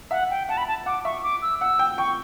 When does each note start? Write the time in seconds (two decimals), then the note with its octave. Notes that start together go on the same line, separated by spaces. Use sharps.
0.11 E5 F#5
0.30 G5
0.49 F#5 A5
0.57 B5
0.68 A5
0.86 F#5 D6
1.05 E5 C#6
1.23 D6
1.42 E6
1.61 F#5 E6
1.79 G5
1.98 G5 C#6